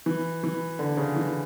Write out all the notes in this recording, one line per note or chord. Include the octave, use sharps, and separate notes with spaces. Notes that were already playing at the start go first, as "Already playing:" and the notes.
E3
E3
D3
C#3
E3